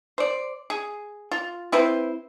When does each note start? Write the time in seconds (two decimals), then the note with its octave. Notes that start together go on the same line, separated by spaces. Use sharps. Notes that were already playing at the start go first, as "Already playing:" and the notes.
0.18 C5 D5
0.70 G#4
1.31 F4
1.72 C4 E4 B4 C5